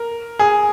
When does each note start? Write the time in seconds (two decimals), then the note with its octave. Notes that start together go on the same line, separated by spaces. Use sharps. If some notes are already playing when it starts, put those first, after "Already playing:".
Already playing: A#4
0.39 G#4